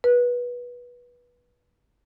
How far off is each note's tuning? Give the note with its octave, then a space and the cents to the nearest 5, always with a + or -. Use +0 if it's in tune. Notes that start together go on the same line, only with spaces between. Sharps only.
B4 -20